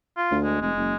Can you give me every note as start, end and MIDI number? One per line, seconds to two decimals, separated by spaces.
0.17 0.37 65
0.31 0.57 38
0.44 0.58 56
0.61 0.72 29
0.61 0.97 56
0.78 0.93 30